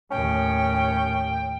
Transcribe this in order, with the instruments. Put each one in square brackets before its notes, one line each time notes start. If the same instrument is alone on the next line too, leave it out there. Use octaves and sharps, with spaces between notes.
[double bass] D#2 A2 [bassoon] C#4 [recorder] G5